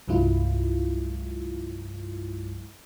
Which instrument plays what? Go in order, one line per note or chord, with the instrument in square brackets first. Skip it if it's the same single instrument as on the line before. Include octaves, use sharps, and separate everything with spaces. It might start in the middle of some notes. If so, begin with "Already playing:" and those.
[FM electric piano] C2 G2 F#3 G#3 E4 F4